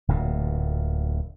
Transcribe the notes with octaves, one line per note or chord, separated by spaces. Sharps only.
D1 D2 A#2